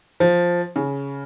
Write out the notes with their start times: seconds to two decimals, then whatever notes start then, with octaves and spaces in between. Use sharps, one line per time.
0.20 F3
0.76 C#3